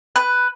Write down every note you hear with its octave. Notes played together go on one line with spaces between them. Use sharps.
B4